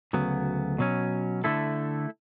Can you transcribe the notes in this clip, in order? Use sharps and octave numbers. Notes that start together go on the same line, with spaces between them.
D2 C#3 F#3 B3
B2 F#3 C#4
D3 A3 E4 A4